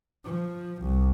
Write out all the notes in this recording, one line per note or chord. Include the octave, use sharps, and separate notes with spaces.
F3
C2